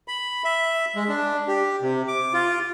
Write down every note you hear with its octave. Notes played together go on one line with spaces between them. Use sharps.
B5
E5
G#3
D4
G4
C3
D6
F4